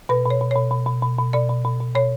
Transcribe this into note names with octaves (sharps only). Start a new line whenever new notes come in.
B2 B4
B2
C#5
B2
B2 C#5
B2
B2
B2
B2
B2 D5
B2
B2
B2
B2 C#5